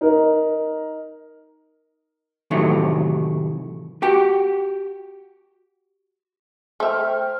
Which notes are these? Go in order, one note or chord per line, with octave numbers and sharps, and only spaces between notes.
D#4 A#4
A2 C3 D#3 E3 F#3 A3
F#4 G4 G5
A3 C5 E5 G5 F6